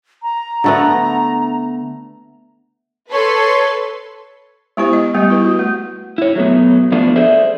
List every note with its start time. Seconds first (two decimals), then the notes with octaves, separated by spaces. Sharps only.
0.22 A#5
0.64 D3 A3 B3
3.12 A4 B4 C#5 C6
4.77 G#3 B3 E4 G4 C5
4.93 D#5
5.14 G3 A3 B3 G4
5.30 E4 B4
5.45 F#4
5.59 A3
6.18 E4 C#5
6.36 F#3 A3 B3
6.92 F3 A3 B3 D4 F4
7.16 G#4 A4 C5 D5 E5